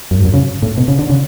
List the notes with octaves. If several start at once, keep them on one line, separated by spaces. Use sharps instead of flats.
F#2
G#2
F#2
C#3
A2
B2
C#3
D3
C#3